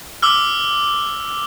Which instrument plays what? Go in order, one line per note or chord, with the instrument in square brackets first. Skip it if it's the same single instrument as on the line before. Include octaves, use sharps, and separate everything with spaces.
[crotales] D6 E6 F6